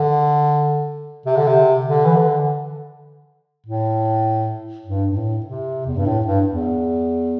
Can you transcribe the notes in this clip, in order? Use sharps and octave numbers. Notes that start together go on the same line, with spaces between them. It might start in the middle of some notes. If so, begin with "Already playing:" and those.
Already playing: D3
C3
D3
C3
D3
E3
D3
A2
G2
G2
A2
C3
E2
G2
A2
G2
E2